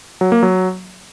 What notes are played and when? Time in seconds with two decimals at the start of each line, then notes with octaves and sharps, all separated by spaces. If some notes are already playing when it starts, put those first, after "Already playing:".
0.21 F#3
0.32 A#3
0.43 F#3